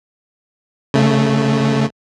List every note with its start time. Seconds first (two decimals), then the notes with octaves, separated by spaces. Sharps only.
0.94 C#3 A3